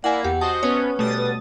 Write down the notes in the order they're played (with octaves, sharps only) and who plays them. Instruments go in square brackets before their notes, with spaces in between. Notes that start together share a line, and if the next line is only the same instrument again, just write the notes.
[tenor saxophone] A#3 [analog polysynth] E4 [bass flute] D5 [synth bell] F#5 G#5
[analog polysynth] E2 [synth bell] G4 [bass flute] F#5
[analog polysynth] F#4 C5 [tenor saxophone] D#5 [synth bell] A5
[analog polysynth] B3 C#4 [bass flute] B4 [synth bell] C#5
[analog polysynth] B2 D#6 A6 [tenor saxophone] G3 [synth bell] A3
[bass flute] B4